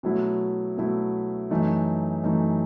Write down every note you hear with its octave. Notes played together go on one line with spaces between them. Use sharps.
B2 F#3 A3 E4
B2 F#3 A3 E4
F#2 E3 A3 D#4
F#2 E3 A3 D#4